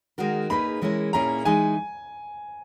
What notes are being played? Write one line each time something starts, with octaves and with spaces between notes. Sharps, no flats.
D#3 G#3 D#4 F#4 A#4
A#3 D#4 G#4 B4 B5
E3 G#3 C#4 E4 A#4
A#2 A#3 C#4 E4 G#4 A#5
E3 G#3 D#4 G#5